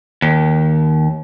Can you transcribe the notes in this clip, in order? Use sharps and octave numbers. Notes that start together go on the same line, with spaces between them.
D#2